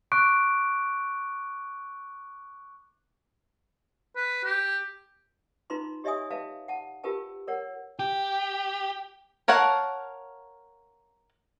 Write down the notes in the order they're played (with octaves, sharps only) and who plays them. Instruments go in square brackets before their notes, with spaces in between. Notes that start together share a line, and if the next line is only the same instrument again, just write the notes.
[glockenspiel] C#6 D6 F#6 D7
[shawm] B4
G4
[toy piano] D#4 F4 B4 A#5 C6
G4 C#5 D#5 E5 G#5 D#6
B4 E5 F5 G5 A5
F#5 A5
F4 G4 A#4 B4 G5 A5
A#4 C#5 F#5
[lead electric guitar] G4 [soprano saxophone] G5
[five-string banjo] A#4 C#5 F5 F#5 A5